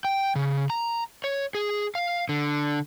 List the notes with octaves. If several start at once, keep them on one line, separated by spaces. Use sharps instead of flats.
G5
C#3
A#5
C#5
G#4
F5
D3